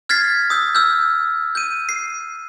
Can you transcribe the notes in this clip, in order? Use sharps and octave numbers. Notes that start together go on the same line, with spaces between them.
F6 G#6 A6 B6 C7
D#6 E6 G6
E6 F6 G6
G6 D#7
C7